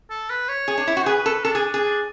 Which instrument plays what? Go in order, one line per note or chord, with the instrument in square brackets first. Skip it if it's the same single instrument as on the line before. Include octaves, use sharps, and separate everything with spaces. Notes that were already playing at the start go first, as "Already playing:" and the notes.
[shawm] A4
B4
C#5
[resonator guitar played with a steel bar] G#4
D4
E4
F#4
[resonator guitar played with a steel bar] G#4 [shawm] B4
[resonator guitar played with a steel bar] A4
[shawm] D4 [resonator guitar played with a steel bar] A4
[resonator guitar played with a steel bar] G#4
G#4
[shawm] D4